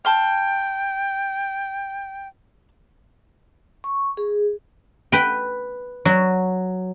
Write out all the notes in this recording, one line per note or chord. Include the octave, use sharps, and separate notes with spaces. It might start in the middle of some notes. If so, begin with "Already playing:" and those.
G5 A5 C6 F6
C#6
G#4
B4 G5
F#3